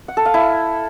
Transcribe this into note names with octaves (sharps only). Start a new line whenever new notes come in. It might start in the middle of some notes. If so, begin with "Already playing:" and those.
F#5
A4
F5
E4